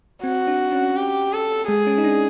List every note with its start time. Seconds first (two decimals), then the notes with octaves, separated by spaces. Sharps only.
0.24 C4 F#4
0.47 D4
0.72 C#4
0.96 G4
1.33 A4
1.68 G#3 G#4
1.87 C#4
1.98 D#4
2.04 D4